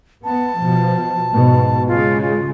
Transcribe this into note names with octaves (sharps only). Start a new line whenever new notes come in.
B3 A5
B2 F3
G#2 B2
C#3 G#3 F4
F4